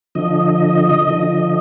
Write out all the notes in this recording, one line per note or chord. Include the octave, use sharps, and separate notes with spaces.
D3 F3 D#5
D3 F3